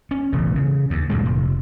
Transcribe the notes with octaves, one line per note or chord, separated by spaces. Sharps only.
C#4
E1 A1 C#3
C#3
D#2
F#1 A#2 D#3 G#3
F1